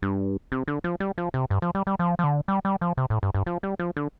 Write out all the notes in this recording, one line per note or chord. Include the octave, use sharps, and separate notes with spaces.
G2
C3
D3
F3
G3
F3
C3
G2
F3
G3
G3
F3
F3
D3
G3
G3
F3
C3
A2
G2
G2
F3
G3
F3
D3